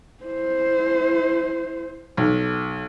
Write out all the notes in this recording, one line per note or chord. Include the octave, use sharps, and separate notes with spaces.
E4 C5
B1